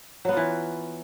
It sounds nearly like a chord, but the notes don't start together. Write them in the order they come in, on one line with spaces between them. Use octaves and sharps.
F#3 B3 F4 E3